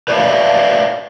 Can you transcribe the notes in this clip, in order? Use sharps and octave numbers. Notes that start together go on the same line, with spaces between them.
B4 C#5 D5 E5 F5